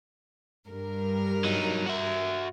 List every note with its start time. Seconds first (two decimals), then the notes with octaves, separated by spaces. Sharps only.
0.68 G2 A#4
1.44 F#3 D#4
1.86 F#4 E5